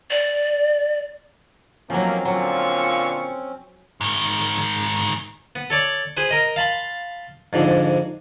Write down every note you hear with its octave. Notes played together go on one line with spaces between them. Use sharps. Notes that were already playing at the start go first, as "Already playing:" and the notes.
D5
D#2 F3 F#3 A3 A#3 C4 C#4
A#2 D3 F#3 F4 C#6
G#2 D#3
B3
A4 C#5 D5
G#4 B4 C5
A#4 D#5
F5 A5 B5 C6
F2 G#2 D3